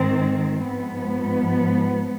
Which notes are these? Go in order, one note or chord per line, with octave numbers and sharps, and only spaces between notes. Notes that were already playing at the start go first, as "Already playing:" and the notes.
Already playing: G#2 D#3 C4
G#2 F3 B3